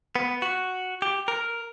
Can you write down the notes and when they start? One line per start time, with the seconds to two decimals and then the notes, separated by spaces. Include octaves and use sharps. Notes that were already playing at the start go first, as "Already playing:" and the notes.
0.16 B3
0.42 F#4
1.02 G4
1.28 A#4